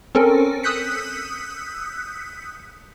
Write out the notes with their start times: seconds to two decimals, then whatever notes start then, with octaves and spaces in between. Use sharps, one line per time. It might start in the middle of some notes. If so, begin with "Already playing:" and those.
0.15 C4 C#4 A4 A#4
0.63 D#6 E6 F#6 G6 B6 C#7